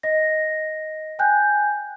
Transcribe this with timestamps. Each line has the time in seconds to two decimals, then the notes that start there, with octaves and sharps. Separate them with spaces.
0.03 D#5 A#6
1.19 G5 G#5 F#6 G6